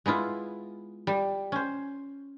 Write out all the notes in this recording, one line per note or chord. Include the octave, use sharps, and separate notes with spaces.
G#3 B3 E4 F4
G3
C#4 C5